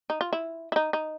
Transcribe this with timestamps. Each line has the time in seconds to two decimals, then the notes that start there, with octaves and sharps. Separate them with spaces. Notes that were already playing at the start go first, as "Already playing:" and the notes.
0.10 D#4
0.21 F4
0.33 E4
0.72 E4
0.76 D#4
0.93 D#4